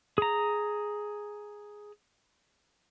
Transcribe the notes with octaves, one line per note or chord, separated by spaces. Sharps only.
G#4 A#5